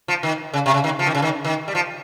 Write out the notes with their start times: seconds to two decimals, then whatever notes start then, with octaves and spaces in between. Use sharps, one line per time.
0.08 F3
0.23 D#3
0.53 C#3
0.66 C3
0.74 C#3
0.84 D#3
0.99 F3
1.07 D#3
1.15 C#3
1.22 D#3
1.45 D#3
1.68 G3
1.75 F3